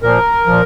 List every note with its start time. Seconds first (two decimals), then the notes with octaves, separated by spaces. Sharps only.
0.03 A#2 F3 A#4
0.46 A#2 F3